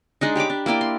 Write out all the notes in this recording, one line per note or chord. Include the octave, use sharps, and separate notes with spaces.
G#3 D4 D#4
G4 C#5 B5 D6
D4
A#3 E4 D5 G5
C6